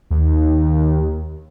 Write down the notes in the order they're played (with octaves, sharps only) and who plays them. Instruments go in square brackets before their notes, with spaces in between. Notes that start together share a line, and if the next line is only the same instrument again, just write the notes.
[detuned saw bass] D#2